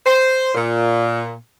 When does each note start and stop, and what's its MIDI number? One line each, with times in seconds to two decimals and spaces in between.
0.06 0.52 72
0.54 1.32 46